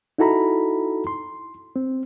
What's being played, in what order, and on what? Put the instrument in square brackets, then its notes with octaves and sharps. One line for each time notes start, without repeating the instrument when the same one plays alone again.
[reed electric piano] D#4 E4 F#4 A4 A#5 B5
C6
C4